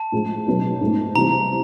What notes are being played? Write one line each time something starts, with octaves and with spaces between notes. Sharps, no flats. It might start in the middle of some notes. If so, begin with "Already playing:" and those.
Already playing: A5
A2 F3 G#3
B2 F#3 B3 D#4
G#2 F3 A3
C3 E3 G3 C4 A#5